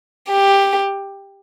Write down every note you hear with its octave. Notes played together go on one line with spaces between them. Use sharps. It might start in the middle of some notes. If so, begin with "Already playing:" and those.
G4